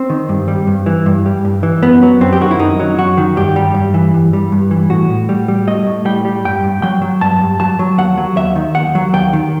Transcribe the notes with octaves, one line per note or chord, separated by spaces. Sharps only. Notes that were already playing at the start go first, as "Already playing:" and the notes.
Already playing: C4
D#3
G2
G3
G2
E3
G2
G3
G2
E3
F#2 B3
F#3
F#2 C4
G4
D#3 F#4
E4
F#2 D#4
F#3
F#2 F#4
D#3
G2 G4
G3
G2
E3
G2
G3
G2
E3
A2 F#4
A2
G3
G3
A2 D#5
A2
G3 G5
G3
G2 G5
G2
F#3 G5
F#3
G2 A5
G2
F#3 A5
F#3
D#2 F#5
F#3
D#2 E5
D#3
D#2 F#5
F#3
D#2 G5
D#3